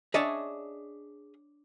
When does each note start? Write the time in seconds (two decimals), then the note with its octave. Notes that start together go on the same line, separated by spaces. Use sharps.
0.14 D4 G#4 C#5 D#5 E5 A5